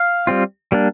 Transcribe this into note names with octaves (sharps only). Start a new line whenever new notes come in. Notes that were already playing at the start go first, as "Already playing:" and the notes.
Already playing: F5
G3 C4 F4
G3 A#3 D4